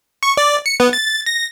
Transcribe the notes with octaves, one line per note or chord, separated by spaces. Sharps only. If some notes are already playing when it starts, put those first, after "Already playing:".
C#6
D5
C#7
B3
A6
A#6